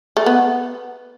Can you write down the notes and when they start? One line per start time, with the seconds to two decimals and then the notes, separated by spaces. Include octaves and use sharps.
0.17 A3
0.26 B3